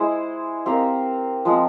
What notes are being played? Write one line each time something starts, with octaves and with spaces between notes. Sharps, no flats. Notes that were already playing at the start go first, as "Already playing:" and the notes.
Already playing: G#3 E4 G#4 C5
C4 G4 A#4 F5
F3 G#3 C4